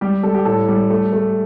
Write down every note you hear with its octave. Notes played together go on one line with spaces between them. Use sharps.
G3 G4
G3 A4
G4
A2 A4
G3
A3
A3